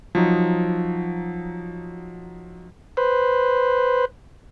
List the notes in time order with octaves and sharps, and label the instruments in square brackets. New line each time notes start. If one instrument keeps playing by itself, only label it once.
[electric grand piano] F3 F#3 D#4
[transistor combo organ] B4 C5